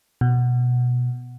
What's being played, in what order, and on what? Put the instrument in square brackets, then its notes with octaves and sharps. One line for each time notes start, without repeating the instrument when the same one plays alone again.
[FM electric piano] B2